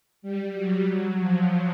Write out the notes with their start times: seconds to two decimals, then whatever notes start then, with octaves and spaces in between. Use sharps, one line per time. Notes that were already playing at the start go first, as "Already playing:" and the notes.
0.22 G3
0.53 F#3
1.19 F3